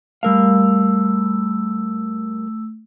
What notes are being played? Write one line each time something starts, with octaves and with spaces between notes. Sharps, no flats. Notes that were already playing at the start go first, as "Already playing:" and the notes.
G3 A3 A#4 F5 E6